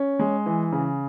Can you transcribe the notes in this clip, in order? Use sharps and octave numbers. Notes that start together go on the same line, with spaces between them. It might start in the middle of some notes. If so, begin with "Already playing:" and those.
Already playing: C#4
G#3
E3
C#3